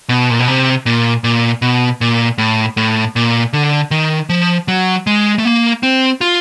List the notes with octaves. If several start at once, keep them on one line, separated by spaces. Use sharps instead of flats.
B2
A#2
B2
C3
A#2
A#2
B2
A#2
A2
A2
A#2
D3
D#3
F3
F#3
G#3
A3
A#3
C4
F4